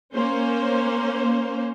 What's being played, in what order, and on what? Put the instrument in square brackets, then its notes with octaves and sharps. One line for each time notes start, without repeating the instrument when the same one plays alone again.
[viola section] A#3 C#4 C5